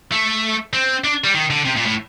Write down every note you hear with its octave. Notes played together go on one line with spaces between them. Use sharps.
A3
C4
D4
G3
D#3
D3
C3
A#2
A2